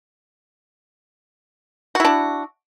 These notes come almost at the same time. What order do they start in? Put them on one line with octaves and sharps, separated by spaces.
F#4 E4 D4